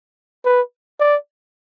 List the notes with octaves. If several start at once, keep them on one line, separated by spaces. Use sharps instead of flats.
B4
D5